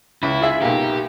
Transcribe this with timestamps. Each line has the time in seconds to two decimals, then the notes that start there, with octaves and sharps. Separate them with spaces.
0.23 C#2 E4
0.41 F4 G#4 E5
0.62 B1 A#3 G4